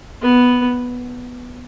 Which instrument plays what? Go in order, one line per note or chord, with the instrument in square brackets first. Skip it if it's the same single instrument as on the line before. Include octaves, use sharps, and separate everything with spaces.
[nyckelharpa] B3